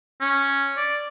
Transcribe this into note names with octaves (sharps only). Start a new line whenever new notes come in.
C#4
D5